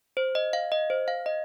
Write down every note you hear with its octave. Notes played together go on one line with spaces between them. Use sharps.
C5
D#5
F5
D#5
C5
F5
D#5